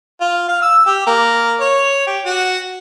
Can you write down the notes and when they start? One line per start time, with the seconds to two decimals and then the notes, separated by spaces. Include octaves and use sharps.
0.20 F4
0.48 F5
0.62 E6
0.86 G4
1.06 A#3
1.60 C#5
2.07 G4
2.25 F#4